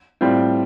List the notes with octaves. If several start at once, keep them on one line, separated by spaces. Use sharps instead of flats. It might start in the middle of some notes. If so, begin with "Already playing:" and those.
A2 G3 C4 F4